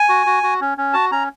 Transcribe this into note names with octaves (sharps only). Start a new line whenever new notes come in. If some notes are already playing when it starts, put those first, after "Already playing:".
Already playing: G#5
F#4
F#4
F#4
C#4
C#4
F#4 A5
C#4 A#5